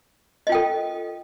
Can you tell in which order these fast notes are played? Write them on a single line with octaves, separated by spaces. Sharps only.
D#5 F4 G5 A4